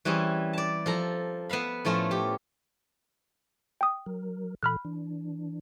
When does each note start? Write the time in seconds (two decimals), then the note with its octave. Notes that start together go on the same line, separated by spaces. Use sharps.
0.05 E3 G3 C4 C#4 G#4
0.53 D5 A5
0.86 F3 A4 A#5
1.49 B3 E5 F5 B5
1.85 A2 F3 A3 C#4 F4
2.11 G4
3.81 G5 D#6
4.06 F#3 A#4
4.63 A#2 E3 A4 B5 F6 F#6
4.85 E3 D4